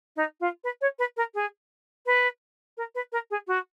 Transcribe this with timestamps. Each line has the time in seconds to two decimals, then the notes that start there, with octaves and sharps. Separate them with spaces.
0.16 D#4
0.40 F4
0.64 B4
0.81 C#5
0.99 B4
1.17 A#4
1.35 G#4
2.06 B4
2.77 A#4
2.95 B4
3.12 A#4
3.31 G#4
3.47 F#4